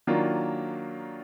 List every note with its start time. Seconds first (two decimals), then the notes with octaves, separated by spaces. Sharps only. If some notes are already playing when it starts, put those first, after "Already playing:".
0.07 D#3 F#3 A#3 D4 F4